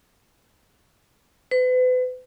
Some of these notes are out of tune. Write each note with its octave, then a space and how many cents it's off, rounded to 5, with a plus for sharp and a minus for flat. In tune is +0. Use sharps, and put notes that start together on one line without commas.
B4 +40